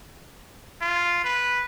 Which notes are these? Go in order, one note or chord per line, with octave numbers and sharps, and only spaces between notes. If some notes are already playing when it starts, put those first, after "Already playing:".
F4
B4